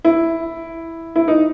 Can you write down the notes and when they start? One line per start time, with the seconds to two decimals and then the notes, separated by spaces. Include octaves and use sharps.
0.04 E4
1.16 E4
1.28 D#4